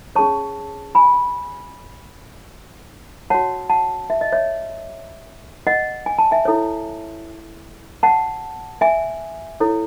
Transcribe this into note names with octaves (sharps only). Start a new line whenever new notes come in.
C#4 G#4 C#5 A5 C#6
G#5 B5
F#4 C#5 F#5 A5
F#5 A5
E5
D#5
C#5 E5
D#5 F#5
G#5
A5
E5 G#5
E4 A4 C#5
F#5 A5
E5 G#5
E4 A4 C#5